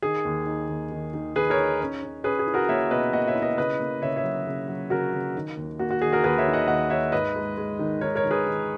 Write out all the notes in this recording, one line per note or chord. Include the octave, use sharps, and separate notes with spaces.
D#3 G#4
D#2
D#4
D#2
D#3
D#3
D#3 G#4 B4
A#4 C#5
D#4
C#4
C#4
C#4 G#4 B4
G#4
E4
F#4 A#4
A#3 C#5 E5
B2 B4 D#5
A#3 D#5 F#5
C#5 E5
E4
B4 D#5
C#3 B4 D#5
A#3
C#3 C#5 E5
C#5 E5
F#3
C#3
F#3
C#3 F#4 A#4
C#3
D#3
D#2
A#3 F#4
F#4
D#3 G#4
F#4 A#4
D#2 G#4 B4
C#5 E5
D#3
D#5 F#5
D#2 D#5 F#5
D#4 C#5 E5
G#2 B4 D#5
G#3
G#3
D#3
D#3 A#4 C#5
A#4 C#5
D#3
G#4 B4
D#3